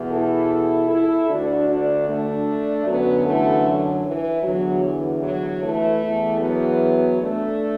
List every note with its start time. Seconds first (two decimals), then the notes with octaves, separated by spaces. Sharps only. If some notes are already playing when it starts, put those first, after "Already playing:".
Already playing: E2 B2
0.10 E4 A4
0.89 E4 A4
1.28 D2 D3 D4 F#4
1.67 D4 F#4
2.07 A3 D4
2.86 F#2 D3 F#3 B3
3.25 E3 A3
3.65 F#3
4.05 E3
4.43 E2 D3 F#3
4.83 E3
5.22 F#3
5.62 E3 A3
6.01 E2 E3
6.40 F#3 B3
7.19 A3 D4